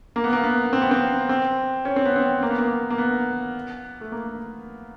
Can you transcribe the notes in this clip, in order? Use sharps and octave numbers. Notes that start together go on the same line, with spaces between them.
A#3
B3
A#3
B3
C4
B3
C4
C4
C#4
C4
B3
C4
A#3
B3
A#3
A#3
B3
A3
A#3